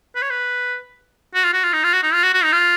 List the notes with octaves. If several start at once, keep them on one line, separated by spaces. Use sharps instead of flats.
B4
C#5
B4
F#4
F4
F#4
F4
D#4
F4
F#4
D#4
F4
F#4
F#4
D#4
F4